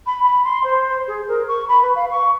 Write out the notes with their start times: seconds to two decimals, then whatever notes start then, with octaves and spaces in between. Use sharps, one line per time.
0.06 B5
0.23 B5
0.44 C6
0.63 C5
1.07 G#4
1.28 A#4
1.48 C#6
1.68 B5
1.82 B4
1.95 F5
2.11 C#6